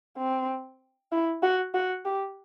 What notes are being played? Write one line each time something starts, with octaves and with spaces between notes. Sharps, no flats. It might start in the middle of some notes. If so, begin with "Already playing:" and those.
C4
E4
F#4
F#4
G4